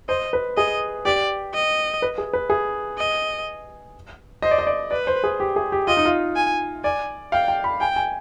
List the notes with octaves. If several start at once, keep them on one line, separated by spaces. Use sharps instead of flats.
C5 D#5
B4
G#4 D#5
G4 D5
D#5
B4
G#4
B4
G#4
D#5
C5 D#5
D5
D#5
D5
B4 D5
C5
G#4
G4
G#4
G4
F4 D#5
D#4
F4
G#5
D5 G#5
F5 G5
G5
B5
G5 G#5
G#5